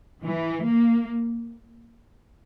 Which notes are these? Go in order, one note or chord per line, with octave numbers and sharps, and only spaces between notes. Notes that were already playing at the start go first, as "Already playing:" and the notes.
E3
A#3